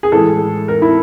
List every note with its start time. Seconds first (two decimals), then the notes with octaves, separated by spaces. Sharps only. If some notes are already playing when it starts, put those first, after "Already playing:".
0.03 G#4
0.12 A2 E3 G#3 A4
0.68 A#4
0.82 E4